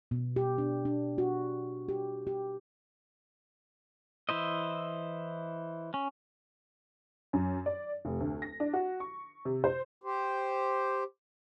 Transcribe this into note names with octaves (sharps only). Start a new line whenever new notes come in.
B2
G4
D4
D4
F#4
G4
G4
E3 E4 C5 D#5
C#4
F#2
D5
F1
D2
A#6
D4
F#4
C#6
C3
C5
G4 C5